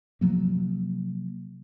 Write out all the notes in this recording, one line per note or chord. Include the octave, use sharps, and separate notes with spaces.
C3 F3 F#3 A#3